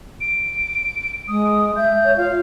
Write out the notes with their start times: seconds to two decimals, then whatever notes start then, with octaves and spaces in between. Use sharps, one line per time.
0.21 D7
1.28 G#3 D#6
1.76 E5 G6
2.04 C#5
2.17 F4 F5